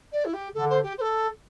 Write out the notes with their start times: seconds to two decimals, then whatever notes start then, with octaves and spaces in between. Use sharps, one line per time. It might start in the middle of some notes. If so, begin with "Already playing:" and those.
0.12 D5
0.25 E4
0.33 G4
0.54 D3 A4
0.69 C5
0.83 G4
0.97 C5
1.01 A4